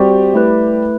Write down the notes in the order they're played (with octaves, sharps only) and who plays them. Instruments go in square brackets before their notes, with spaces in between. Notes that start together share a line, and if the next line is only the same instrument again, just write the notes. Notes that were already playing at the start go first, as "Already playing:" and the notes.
Already playing: [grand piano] G3 G4 [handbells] C4 F#4 C5 G5
[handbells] A3 E4 B4